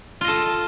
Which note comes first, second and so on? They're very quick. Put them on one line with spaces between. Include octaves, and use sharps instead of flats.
F4 D#5 A4